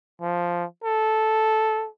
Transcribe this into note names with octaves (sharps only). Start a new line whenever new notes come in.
F3
A4